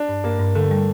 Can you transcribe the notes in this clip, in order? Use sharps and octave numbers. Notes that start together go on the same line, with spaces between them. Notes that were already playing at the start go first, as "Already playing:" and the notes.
Already playing: D4
G2
G2 A#3
G2
D3 A3
G3